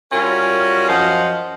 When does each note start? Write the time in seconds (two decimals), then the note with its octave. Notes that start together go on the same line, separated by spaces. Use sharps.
0.13 G3 C#4 F4 F#4 A#4
0.89 F#2 F3 F4 D#5 F5 F#5